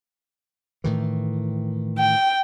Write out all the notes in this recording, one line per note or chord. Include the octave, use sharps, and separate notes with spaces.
A2 D#3 E3
G5